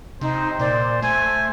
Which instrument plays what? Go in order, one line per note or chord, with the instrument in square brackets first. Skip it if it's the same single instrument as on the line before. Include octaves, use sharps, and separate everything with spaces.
[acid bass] C3 [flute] D#4 [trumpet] C5
[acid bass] A#2 [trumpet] C5 [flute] D5
[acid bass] A3 [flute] C5 [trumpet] G#5